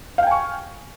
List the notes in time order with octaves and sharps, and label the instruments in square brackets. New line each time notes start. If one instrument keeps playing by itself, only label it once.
[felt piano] F5
G5
G#5
C#6